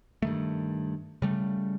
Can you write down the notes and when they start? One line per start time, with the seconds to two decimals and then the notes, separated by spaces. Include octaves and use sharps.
0.22 G2 D#3 A3
1.22 C#3 G3 A3